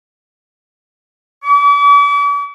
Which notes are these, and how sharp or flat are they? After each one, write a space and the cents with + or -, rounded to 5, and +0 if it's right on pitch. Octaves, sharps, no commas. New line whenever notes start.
D6 -45